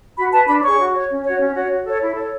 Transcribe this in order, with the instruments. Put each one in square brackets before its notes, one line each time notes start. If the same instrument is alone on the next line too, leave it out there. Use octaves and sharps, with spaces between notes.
[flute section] F#4 B5
B4 A5
D4 B5
G#4 C#5 C#6
F#4
C#5
C#4
F#4 C#5
C#4
F#4 C#5
F#4
A4 C#5
E4
A4 C#5